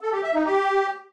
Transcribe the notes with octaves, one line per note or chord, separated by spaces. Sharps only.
A4
G4
E5
D#4
G4